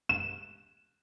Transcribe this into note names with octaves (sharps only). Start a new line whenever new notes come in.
E7